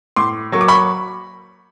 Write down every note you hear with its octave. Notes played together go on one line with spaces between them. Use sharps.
A2 C6 D6
F#3 A#3 C#6
D6
B5 C#6